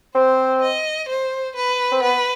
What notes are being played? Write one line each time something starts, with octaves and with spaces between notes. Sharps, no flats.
C4 C5
D#5
C5
B4
C4
B3 B4